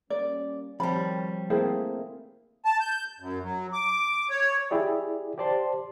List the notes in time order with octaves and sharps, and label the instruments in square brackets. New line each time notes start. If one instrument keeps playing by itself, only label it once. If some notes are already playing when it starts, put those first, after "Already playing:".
[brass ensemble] G3 A#3 C#4 [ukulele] D5
[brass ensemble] D#3 C#5 [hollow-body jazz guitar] F3 G3 [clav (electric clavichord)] C4 A5 [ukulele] B5
[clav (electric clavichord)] A3 A#3 E4 [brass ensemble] C4 [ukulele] G#4 C5 G5
[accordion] A5
G6
F#2
F#3
D6
C#5
[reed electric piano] E4 G4 G#4 D5
G4 C5 D5 A5 C6